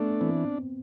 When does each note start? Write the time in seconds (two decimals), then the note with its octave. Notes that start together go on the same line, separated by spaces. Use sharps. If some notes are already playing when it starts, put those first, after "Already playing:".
Already playing: A3 B3 D4
0.20 E3 C4